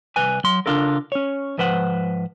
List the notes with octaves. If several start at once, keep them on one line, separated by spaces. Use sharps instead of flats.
C2 B4 G#5
F#3 C6
C#3 D4 F4 A4 A#4
C#4 C#5
G#2 F3 B4 C5 F#5